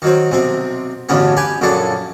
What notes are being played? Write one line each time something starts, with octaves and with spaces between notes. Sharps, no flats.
D#3 F#3 C4
B1 C3 C4
A1 D2 G2 C#3 B3 C#4
G4 B4 G#5
A#1 F#2 C#3 D4 A4